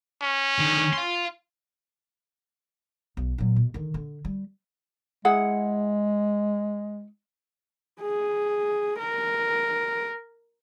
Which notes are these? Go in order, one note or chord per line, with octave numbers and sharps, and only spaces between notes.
C#4
D3 D#3
F5 C6
B1
A#2 F#3
B2
D3 D#3
D3
G3
G#3 E4 G#4 F#5
G#4
A#4